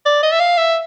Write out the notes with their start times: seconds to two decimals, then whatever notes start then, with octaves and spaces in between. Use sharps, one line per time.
0.06 D5
0.23 D#5
0.32 E5
0.40 F5
0.58 E5